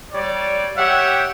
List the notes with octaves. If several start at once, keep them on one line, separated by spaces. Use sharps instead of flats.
G3 C#5 D5
G4 C#5 E5 F#5 G5